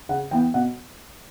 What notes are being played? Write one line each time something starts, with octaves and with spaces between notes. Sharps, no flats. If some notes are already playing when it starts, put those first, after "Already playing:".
C#3 F#5
E3 B3 G5
B2 F#5